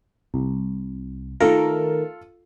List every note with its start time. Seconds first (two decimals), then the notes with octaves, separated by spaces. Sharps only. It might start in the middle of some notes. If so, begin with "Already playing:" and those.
0.34 C2
1.40 D#3 A3 F4 A4 A#4